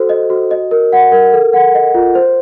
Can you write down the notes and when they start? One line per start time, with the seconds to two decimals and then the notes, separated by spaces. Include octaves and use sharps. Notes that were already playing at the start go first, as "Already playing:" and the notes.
Already playing: F#4 A4 C5
0.09 D#5
0.30 F#4
0.51 D#5
0.71 A#4
0.93 F#5
1.12 A#4
1.33 A4
1.53 F#5
1.75 D#5
1.94 F4
2.15 C5